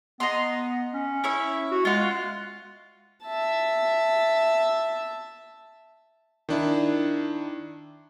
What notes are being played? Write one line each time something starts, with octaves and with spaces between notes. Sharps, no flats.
B3 D#5 A#5 C6
C#4
E4 C#5 E5
F#4
G#3 F4 F#5
E5 A5
D#3 D4 E4